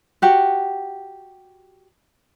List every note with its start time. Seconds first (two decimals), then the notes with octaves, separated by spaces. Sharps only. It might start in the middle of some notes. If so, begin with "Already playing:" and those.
0.22 F#4 G4 F#5